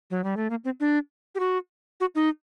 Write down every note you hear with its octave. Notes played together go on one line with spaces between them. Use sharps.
F#3
G3
A3
A#3
C4
D4
G4
F#4
F#4
D#4